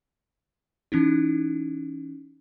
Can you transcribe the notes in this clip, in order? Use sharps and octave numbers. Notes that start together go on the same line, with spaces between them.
E3 C#4 D#4 E4